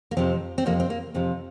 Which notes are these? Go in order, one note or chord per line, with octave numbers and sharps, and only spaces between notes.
A#3
F2 C3 F3 C4
C4
F2 C3 F3 A#3
C4
A#3
F2 C3 F3